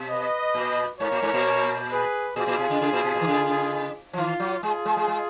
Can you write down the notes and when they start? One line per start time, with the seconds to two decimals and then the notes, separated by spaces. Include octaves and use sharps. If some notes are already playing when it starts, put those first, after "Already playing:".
Already playing: B2
0.09 B4 D#5
0.55 A#2
1.00 G#2 A#4 C#5
1.12 A#2
1.22 G#2
1.34 A#2
1.90 G#4 B4
2.36 A#2 F4 G#4
2.48 A#2
2.59 B2
2.70 C#3
2.81 C#3
2.93 A#2
3.04 B2
3.15 A#2
3.22 D#3
3.27 C#3
4.13 F3
4.17 D#3 F4
4.40 F#3
4.62 G#3 F4 G#4
4.86 G#3
4.97 G#3
5.08 G#3